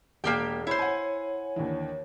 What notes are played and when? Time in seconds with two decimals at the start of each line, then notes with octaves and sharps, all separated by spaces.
0.24 E1 A#3 G4 G5
0.67 E4 C5 C#5
0.79 F#5 G#5
1.56 D#2 D3 E3